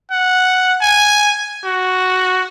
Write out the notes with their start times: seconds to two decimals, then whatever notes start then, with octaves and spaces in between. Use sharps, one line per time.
0.11 F#5
0.81 G#5
1.64 F#4